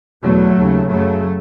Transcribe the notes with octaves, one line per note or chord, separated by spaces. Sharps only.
E2 B2 F#3 A3
D#2 C#3
F#2 C#3 F#3 A3